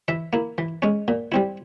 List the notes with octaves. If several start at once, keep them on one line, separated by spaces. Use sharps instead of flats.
E3 E5
A#3 E4
E3
G#3 C#4
A#2
G3 C4 E4